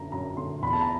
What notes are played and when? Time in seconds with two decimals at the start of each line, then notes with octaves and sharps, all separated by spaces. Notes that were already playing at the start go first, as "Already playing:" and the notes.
Already playing: F#2 D3 A#5
0.12 F#2 A#5
0.37 D3 C6
0.62 E2 B5
0.73 A5
0.81 A#5